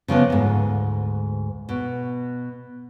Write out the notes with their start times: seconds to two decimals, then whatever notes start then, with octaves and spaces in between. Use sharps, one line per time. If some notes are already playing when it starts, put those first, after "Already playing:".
0.08 C#3 F3 A#3 B3
0.30 D2 G#2
1.69 B2